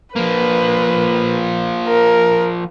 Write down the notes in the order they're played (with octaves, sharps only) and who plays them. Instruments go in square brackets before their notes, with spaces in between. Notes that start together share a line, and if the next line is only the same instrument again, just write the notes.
[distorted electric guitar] F3 A#3 [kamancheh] B4
[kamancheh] A#4